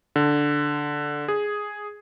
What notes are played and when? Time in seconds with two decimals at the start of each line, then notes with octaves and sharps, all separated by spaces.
0.16 D3
1.28 G#4